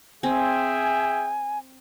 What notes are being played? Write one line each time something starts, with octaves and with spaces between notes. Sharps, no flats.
C4 G#4 E5 G5 G#5